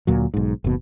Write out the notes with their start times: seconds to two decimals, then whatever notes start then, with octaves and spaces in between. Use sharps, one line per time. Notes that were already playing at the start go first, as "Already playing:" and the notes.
0.07 D2 A#2 F#3
0.34 B1 G#2
0.64 F#1 D#2 B2